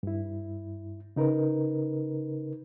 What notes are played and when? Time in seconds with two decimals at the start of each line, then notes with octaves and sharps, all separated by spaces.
0.03 G2 E4
1.16 C#3 D#4 A#4 B4